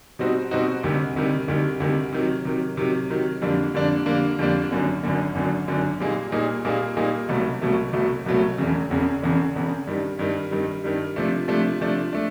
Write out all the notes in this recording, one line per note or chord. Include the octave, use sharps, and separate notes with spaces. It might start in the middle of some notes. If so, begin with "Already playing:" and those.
B2 G3 C4 D#4 F#4
B2 G3 C4 D#4 F#4
D2 C3 D#3 G3
D2 C3 D#3 G3
D2 C3 D#3 G3
D2 C3 D#3 G3
C3 D#3 F#3
C3 D#3 F#3
C3 D#3 F#3
C3 D#3 F#3
F2 D3 G3 A#3 D4
F2 D3 G3 A#3 D4
F2 D3 G3 A#3 D4
F2 D3 G3 A#3 D4
G#1 F#2 D3
G#1 F#2 D3
G#1 F#2 D3
G#1 F#2 D3
A#2 G3 A#3 D#4 G#4
A#2 G3 A#3 D#4 G#4
A#2 G3 A#3 D#4 G#4
A#2 G3 A#3 D#4 G#4
C2 B2 F#3 A3
C2 B2 F#3 A3
C2 B2 F#3 A3
C2 B2 F#3 A3
E1 E2 C#3
E1 E2 C#3
E1 E2 C#3
E1 E2 C#3
G2 D#3 G3
G2 D#3 G3
G2 D#3 G3
G2 D#3 G3
C3 F3 A3 D4
C3 F3 A3 D4
C3 F3 A3 D4
A3 D4